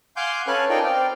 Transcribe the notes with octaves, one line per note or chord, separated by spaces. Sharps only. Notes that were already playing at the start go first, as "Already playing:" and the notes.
F5 F#5 G#5 C6 D6 G6
C#4 A4 B4 F5 G#5 F#6
D#4 F4 A4 A#4 D5 G5
C4 D5 F5 G5